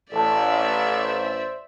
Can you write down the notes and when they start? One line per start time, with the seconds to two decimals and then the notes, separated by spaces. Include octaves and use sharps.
0.12 A1 A4 D5 E5 A5
1.04 C5